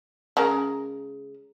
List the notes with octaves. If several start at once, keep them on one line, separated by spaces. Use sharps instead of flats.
C#3 G#3 A#4